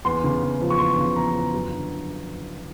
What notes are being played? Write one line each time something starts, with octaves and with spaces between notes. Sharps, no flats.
E2 C6
C#3
E2
F3
C#6
E2 C6
C#3
E2 A#5
F3
F#2
D3